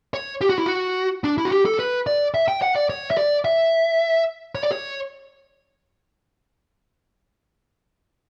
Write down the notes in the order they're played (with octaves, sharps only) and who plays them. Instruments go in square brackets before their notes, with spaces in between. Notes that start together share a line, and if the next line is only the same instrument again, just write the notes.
[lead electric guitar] C#5
G4
F#4
E4
F#4
D4
E4
F#4
G4
A4
B4
D5
E5
G5
F#5
D5
C#5
E5
D5
E5
C#5
D5
C#5